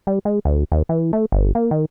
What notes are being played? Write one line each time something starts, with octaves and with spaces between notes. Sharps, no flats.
G3
G#3
D2
D#2
E3
A3
G1
A#3
D#3